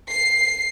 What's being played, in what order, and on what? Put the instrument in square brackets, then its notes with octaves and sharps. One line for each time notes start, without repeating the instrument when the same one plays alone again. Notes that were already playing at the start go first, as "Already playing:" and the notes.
[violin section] C7